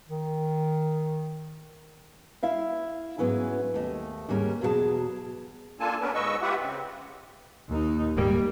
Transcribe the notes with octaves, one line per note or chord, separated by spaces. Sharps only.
D#3
E4 E5 F5
G#2 F#3 B3 C#4 E4 G#5
D#2 A3 D#5
D#2 G#2 G3 A#3 C#4
E2 B2 F#3 F4 G#4 A5
A#3 D4 F4 A4 G#5 A5
B3 C#4 D4 A#4 B4
G#2 B4 D#5 C#6 E6
F4 G4 B4 E5 F#5
C#3 C4
D#2 D#4
D#1 G#2 G3 A#3